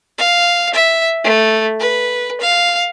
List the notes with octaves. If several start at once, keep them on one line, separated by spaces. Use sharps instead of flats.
F5
E5
A3
B4
F5